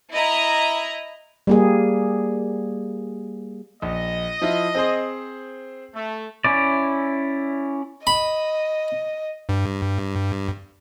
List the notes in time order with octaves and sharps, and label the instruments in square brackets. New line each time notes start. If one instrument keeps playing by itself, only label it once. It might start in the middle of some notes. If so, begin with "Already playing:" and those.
[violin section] E4 D#5 A#5
[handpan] G3 A#3 G#4
[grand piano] A#1 [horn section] D#5
[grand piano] F3 E4 F4
C4 G#4 C5
[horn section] A3
[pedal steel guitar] C#4 E4 D5
[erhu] D#5 [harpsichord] B5
[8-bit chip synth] G2